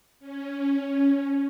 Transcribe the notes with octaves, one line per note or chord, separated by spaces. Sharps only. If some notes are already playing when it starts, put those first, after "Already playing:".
C#4